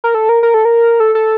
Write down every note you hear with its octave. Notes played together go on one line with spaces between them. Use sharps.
A#4
A4
A#4
A#4
A4
A#4
A4
A4